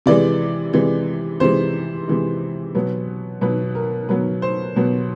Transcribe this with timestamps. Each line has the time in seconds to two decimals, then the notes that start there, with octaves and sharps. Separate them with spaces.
0.06 C3 E3 G#3 D5
0.73 C3 E3 G#3
1.40 C3 E3 G#3 C5
2.08 C3 E3 G#3
2.75 B2 F#3 B3
3.41 B2 F#3 B3 B4
3.75 A#4
4.09 B2 F#3 B3 B4
4.42 C5
4.76 B2 F#3 B3